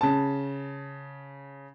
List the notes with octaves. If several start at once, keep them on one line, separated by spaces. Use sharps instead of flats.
C#3 A5